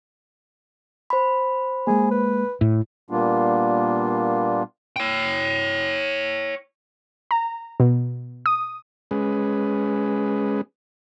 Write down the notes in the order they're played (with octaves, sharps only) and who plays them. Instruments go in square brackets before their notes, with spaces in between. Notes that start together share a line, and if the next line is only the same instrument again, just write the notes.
[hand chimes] C5 B5
[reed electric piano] G#3 A#3 [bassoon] G#4
[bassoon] B4
[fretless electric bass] A2 [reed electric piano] E4
[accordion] A#2 G3 A#3 B3 D4 F4
[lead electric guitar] C#5 G5
[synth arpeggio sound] A#5
B2
D#6
[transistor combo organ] G#3 C#4 G#4 B4